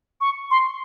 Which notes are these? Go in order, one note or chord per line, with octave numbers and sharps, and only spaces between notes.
C#6
C6